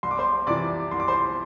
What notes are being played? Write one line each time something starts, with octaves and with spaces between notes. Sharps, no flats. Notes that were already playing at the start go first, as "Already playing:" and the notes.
C2 C6
D6
C5 C6
C3 E3 D5 D6
C2 C6
D6
C5 C6